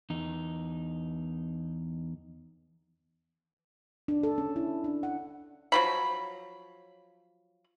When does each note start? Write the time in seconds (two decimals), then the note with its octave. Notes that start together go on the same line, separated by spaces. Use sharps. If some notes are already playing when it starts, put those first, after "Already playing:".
0.10 E2 D#4
4.08 D4
4.23 A4
4.38 C#4
4.56 E4
4.84 D4
5.03 F#5
5.72 F3 F#3 B5